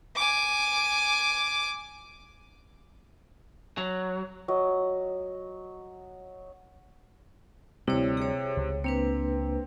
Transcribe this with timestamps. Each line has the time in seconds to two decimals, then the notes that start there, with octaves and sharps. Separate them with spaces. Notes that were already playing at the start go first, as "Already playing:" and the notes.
0.16 G#5 D6
3.78 F#3
4.48 F#3 D#5
7.88 D2 C3 G3 E4 C#5
8.17 G#4 C#5
8.57 C#2
8.84 A#3 C4 D4 B4